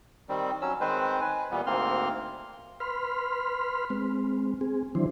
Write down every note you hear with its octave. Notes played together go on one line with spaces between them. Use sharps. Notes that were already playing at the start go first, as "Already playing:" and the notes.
D#3 G3 C4
F#3 C#4 E6
D#3 G#3 C4 B4 C5
B4 G#5
A#2 E3 G3 B3
D2 G#2 A#3 C4 C6 F6
B4 B5 C6 F6
G#3 C4
C4 G#4
D#3 E3 F#3 D4 E4 C5